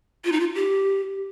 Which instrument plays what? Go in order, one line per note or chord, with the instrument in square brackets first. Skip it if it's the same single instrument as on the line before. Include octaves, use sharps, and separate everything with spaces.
[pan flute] F4
D#4
F4
G4